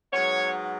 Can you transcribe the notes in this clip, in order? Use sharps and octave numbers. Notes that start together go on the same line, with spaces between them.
G#2 F#3 B3 C#5